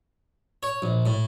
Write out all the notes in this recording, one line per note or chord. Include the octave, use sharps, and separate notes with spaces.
C#5
A#1
A2